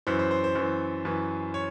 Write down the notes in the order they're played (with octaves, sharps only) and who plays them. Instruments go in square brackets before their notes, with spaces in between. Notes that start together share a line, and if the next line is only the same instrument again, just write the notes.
[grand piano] F#2 E3 C5
C5
C5
C5
F#2 E3
F#2 E3
C#5